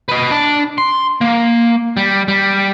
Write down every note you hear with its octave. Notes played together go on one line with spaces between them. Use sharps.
B4 D#5
D4 A5
C6
A#3
G3
G3